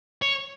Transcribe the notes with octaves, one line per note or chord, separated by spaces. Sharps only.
C#5